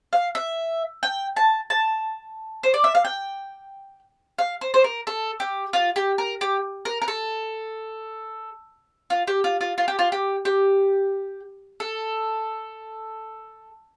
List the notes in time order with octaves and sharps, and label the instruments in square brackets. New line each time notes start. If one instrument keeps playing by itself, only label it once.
[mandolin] F5
E5
G5
A5
A5
C5
D5
E5
F5
G5
F5
C5
C5
A#4
A4
G4
F4
G4
A#4
G4
A#4
A#4
A4
F4
G4
F4
F4
F4
G4
F4
G4
G4
A4